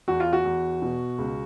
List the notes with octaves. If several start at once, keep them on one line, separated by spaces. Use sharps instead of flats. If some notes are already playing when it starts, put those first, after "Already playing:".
E2 F#4
F4
F#4
E2
B2
C#2